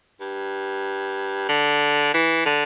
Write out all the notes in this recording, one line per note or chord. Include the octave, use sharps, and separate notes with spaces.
G2
D3
E3
D3